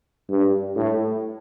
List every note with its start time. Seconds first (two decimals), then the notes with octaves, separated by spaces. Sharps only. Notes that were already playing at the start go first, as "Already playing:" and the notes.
0.30 G2
0.76 A2